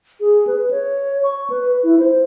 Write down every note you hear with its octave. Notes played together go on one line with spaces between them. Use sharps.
G#4
B4
C#5
C#6
B4
E4
C5